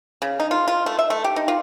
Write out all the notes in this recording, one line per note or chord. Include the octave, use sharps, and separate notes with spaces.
C#3
D#4
F4
F4
A3
E5
A3
G4
D#4
F4